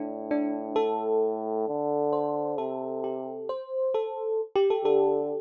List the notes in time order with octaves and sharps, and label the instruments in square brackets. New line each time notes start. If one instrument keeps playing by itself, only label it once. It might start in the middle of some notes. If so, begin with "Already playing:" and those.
Already playing: [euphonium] A2 [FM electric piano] D4
[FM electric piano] D4
A4
[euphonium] D3
[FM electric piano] C5
[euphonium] C3 [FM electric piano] A4
[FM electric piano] G4
C5
A4
G4
A4
[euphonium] D3 [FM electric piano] A4